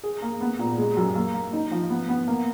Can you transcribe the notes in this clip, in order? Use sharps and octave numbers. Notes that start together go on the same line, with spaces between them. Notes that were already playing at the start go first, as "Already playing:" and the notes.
G#4
A#3
B3
A#2
G#3
F#2
A#3
A#3
D#4
F3
B3
B3
A#3